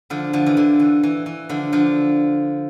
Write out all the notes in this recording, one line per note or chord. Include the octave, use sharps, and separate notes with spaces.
D3 F3
D3 F3
E3
D3
E3
E3
E3
D3 F3
D3 F3